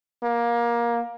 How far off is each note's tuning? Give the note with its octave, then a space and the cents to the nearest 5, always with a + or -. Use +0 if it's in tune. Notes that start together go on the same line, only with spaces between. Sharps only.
A#3 +20